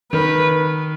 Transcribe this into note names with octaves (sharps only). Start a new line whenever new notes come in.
D#3 B4